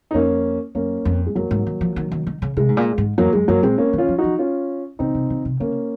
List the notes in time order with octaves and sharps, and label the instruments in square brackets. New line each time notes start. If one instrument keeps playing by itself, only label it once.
[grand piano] D#4
[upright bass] F2 [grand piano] A#3 C#4
[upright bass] F#2 [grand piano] A#3 C#4
[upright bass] F2
[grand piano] G#3
[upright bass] F#2 [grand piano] F#3 A#3
[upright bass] G#2
D#3
F3
D#3
D#3
D#3
C#3
[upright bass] C3 [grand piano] G#3
[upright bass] G#2
A#2
G#2
[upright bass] F2 [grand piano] F#3 A#3
[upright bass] F#2 [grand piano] G#3
[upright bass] F#2 [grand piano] F#3 A#3
[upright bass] A#2 [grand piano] G#3 C4
[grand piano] A#3 C#4
[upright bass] D#3
[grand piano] C#4 F4
[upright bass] F3
[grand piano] D#4 F#4
[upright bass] F3
[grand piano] C#4 F4
[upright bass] C#3 [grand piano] C4 D#4
[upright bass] C3
C#3
C3
[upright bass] C#3 [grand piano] A#3 C#4